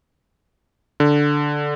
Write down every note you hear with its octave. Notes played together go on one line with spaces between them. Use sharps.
D3